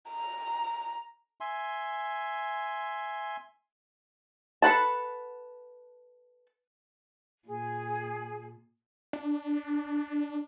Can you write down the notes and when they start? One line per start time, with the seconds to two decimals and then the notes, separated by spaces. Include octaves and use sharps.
0.10 A#5
1.41 E5 G#5 C6
4.62 A4 B4 F#5 A5
7.47 A#2 G#4
9.13 D4